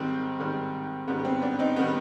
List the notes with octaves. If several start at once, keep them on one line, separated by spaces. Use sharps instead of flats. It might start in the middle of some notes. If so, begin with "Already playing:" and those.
Already playing: G#2 D#3 G3 C4
G#2 D#3 G3
G#2 D#3 G3 B3
C4
B3 D4
C4 D#4
D#3 G3 B3